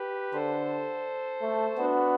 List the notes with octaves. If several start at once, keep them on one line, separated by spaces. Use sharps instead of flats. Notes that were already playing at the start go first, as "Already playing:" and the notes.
Already playing: G4 B4
D3 A4 C5
A3
B3 D4 F#4